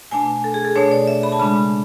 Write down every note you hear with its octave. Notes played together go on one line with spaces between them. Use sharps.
B2 A3 D4 G#5
A4
G#4
A4
B2 A3 D4 C#5
D5
E5
B5
A5
C#3 G#3 D4 B5